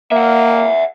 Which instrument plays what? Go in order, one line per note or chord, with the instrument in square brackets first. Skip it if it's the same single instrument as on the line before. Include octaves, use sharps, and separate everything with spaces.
[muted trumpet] A#3 [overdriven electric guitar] E5 F#5